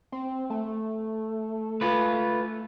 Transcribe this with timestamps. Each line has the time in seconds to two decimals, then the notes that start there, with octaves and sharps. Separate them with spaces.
0.12 C4
0.50 A3
1.81 F4 B4